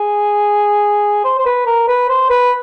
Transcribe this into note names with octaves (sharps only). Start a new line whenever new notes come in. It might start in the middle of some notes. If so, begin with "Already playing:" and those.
Already playing: G#4
C5
C5
B4
A#4
B4
C5
B4